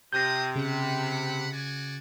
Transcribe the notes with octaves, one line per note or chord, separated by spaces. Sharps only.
C3 F4 D#6 G6 A#6
C#3 F#5 B5
F#4 D5 G#5